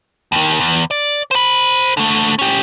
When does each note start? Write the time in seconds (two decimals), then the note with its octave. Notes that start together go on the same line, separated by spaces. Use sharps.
0.32 D#2 D#3
0.60 E2
0.91 D5
1.31 C5 B5
1.97 D3 A3
2.39 C#4 G4